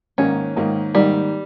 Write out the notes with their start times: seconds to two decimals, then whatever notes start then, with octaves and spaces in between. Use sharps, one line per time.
0.18 G#2 D#3 A#3 C#4 D#4
0.56 G#2 D#3 A#3 D#4
0.94 G#2 D#3 G3 A#3 D#4